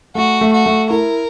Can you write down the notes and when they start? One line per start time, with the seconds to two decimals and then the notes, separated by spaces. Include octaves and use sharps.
0.15 A3 F#4
0.41 A3
0.53 F#4
0.66 A3
0.90 E4 A#4